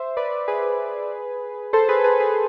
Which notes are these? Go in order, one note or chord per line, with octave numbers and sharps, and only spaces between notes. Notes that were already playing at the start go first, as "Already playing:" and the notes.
Already playing: C5 E5
B4 D5
G#4 B4
A4 C5
G#4 B4
G#4 B4
G#4 B4